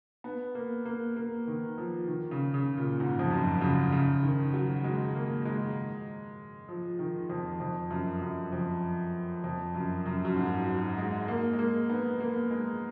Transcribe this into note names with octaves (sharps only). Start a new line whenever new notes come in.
B3
A#3
A#3
A#3
D#3
F3
D#3
C#3
C#3
A#2
G#2
F2
F#2
C#3
C#3
D#3
F#3
G#3
A#3
G#3
F3
D#3
F2
F2
F#2
F#2
F2
F2
F#2
F#2
F#2
G#2
F#3
G#3
A#3
G#3
A#3
B3
A#3
G#3